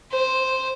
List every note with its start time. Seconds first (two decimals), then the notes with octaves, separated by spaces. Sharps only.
0.11 C5